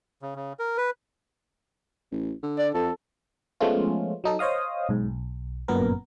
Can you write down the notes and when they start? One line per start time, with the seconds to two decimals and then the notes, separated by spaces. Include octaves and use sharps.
0.22 C#3
0.36 C#3
0.59 A#4
0.77 B4
2.11 A1
2.43 D3
2.58 D5
2.74 F2 A4
3.60 F3 G#3 A3 B3 C#4 F4
4.24 F#3 D#4 A4
4.39 C5 C#5 D#5 F5 D#6
4.89 B1 G#2
5.08 B1
5.68 G1 F#2 A#2 B3 A#4